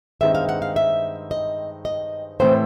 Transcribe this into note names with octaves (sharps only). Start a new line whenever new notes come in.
G2 D#3 G#3 C4 D#4 E5
F5
F#5
F5
E5
D#5
D#5
A2 E3 A3 C4 C5